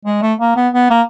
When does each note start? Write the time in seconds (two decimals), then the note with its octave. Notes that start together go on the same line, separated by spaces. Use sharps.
0.05 G#3
0.22 A3
0.40 A#3
0.56 B3
0.74 B3
0.90 A#3